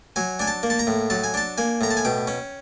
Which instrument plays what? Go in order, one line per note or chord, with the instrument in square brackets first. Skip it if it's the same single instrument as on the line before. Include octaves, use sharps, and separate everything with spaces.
[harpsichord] F#3 G#5
D4 G#5
A5
A#3
A5
A#5
A2
F#3 A5
G#5
D4 A5
A#3 G#5
A2 A#5
A5
G#5
B2 G5
C#4